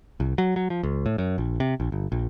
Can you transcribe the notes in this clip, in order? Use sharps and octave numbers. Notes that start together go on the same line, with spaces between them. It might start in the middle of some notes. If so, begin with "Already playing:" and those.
C2
F#3
F#3
F3
C#2
A2
F#2
A#1
C3
A#1
G1
A#1